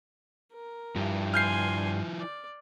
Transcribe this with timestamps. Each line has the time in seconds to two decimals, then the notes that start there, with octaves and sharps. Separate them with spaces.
0.53 A#4
0.96 G2 F3 E4
1.34 G#5 C6 F6 G6 C7
2.20 D5